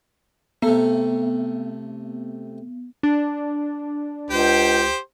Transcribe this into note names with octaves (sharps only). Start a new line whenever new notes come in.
C3 A3 B3
D4
C#2 G4 C5